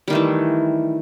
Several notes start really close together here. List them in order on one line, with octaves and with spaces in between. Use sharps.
G3 D#3 A3 E3